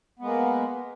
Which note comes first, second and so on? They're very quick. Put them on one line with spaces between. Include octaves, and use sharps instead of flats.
B3 G#3 A#3